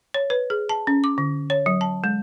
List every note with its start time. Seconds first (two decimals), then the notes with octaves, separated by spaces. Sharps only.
0.14 C#5
0.30 B4
0.50 G#4
0.69 A5
0.87 C#4
1.04 D6
1.18 D3
1.50 C#5
1.66 F#3
1.81 A5
2.04 G#3